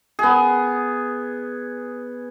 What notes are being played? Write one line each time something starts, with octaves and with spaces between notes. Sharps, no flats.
B3 G#4